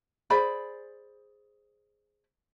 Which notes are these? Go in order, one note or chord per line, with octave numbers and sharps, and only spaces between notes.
G#4 C5 D5 B5